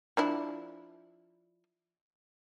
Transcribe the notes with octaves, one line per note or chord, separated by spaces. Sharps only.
F3 D4 E4